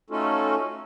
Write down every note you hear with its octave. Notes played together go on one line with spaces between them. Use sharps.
A3 C#4 D#4 F4 F#4 A4